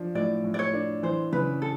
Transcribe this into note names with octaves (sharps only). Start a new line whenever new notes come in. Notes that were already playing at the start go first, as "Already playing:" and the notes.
Already playing: F3 D4
A2 D5
A2
D5
C#5
D4
E3 C5
C#3 B4
A4